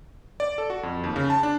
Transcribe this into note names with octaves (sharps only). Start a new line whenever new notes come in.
D5
A4
F#4
F2
D#2
C#3
A5
D4